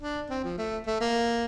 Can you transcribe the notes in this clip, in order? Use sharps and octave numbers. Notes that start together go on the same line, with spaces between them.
D4
C4
F3
A3
A3
A#3